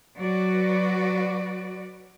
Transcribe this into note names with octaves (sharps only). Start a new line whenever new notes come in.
F#3 F#4 B4 D5